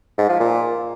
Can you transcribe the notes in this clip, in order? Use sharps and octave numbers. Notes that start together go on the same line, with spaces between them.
G#2
F3
A#2